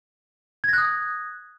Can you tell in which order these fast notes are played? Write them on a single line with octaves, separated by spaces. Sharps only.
G#6 A#6 F#6 D#6